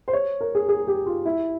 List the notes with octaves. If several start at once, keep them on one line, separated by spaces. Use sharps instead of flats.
C5
C#5
A#4
G#4
G#4
G4
F4
E4